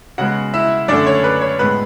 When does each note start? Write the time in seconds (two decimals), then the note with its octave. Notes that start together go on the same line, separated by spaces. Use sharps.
0.18 C#3 G#3 B3 F#4 F#5
0.54 E4 E5
0.88 F#2 D3 A3 D4 D5
1.07 C#5
1.24 B4
1.41 C#5
1.59 A2 G#3 B3 B4